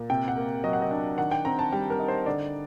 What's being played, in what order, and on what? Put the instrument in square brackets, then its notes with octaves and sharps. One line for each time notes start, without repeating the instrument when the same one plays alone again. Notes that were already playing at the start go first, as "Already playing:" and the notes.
Already playing: [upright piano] A#2
C3 G5
F#5
A#3
F#3 D#5
F#5
D#5
D4
D#3 F#5
G5
C4 A#5
A5
G3 G5
A#4
D#4
C5
D3 D5